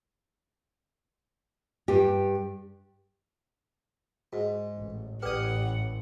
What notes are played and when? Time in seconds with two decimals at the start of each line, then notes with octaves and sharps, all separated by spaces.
1.88 G2 G4
4.33 G#2 F#4
4.77 A1
5.22 A1 G4 B4 D5 F#5 D#6